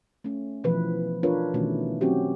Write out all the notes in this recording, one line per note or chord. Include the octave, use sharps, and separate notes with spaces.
A3 C#4
B2 E3 F3 B4
D4 F4 A#4 B4 C#5
B2 D#3 E3 A3 C#4
F#3 C4 C#4 F#4 G4